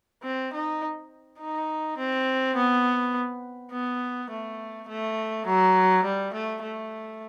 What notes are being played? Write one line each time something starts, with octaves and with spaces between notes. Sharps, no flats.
C4
D#4
D#4
C4
B3
B3
A3
A3
F#3
G3
A3
A3